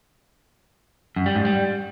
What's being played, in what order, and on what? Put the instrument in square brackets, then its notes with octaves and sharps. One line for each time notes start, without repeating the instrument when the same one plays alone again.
[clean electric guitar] F#2
G3
G#2
G3